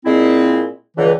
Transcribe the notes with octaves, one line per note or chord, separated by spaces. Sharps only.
A#2 G#3 C4 E4
C#2 D3 E3